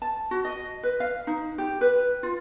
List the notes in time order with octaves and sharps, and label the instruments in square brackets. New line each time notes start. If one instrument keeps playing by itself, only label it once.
[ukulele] A5
F#4
D#5
B4
F5
D#4
G4
B4
F4